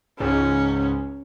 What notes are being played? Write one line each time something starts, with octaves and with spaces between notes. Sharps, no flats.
C#2 G#2 C#4